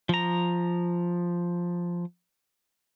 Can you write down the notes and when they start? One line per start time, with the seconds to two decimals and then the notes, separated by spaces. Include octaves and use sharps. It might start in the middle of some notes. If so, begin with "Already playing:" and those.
0.09 F3 A#5